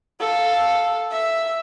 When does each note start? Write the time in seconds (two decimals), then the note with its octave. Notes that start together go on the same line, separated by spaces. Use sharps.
0.21 A4 F5
1.11 E5